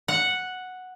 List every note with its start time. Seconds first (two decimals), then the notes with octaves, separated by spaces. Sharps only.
0.08 F#5